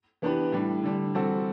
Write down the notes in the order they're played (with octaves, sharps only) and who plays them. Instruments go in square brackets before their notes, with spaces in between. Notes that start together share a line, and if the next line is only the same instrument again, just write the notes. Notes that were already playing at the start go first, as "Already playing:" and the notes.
[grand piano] E3 B3 D4 G4 B4
A2 G3 D4
D3 G3 D4
E3 G3 C4 F#4 A4